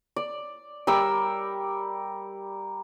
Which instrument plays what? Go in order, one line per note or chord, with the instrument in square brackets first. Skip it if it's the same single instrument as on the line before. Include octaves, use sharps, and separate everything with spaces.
[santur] D5
G3 A#4 E6